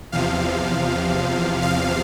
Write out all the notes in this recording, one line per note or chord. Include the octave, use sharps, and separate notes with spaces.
E2 C3 F3 F5
F5